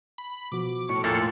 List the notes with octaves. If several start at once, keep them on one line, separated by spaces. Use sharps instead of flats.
B5
B2 F3 F#4 D6
A2 C#6
E2 A#2 A4